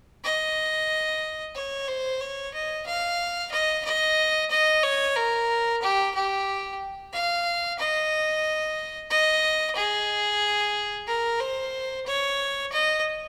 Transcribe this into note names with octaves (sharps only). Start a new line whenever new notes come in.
D#5
C#5
C5
C#5
D#5
F5
D#5
D#5
D#5
C#5
A#4
G4
G4
F5
D#5
D#5
G#4
A#4
C5
C#5
D#5